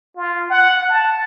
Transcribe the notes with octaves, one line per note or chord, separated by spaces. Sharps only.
F4
F#5
A5